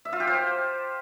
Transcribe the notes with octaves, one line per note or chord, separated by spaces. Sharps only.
E5
F4
G4
C5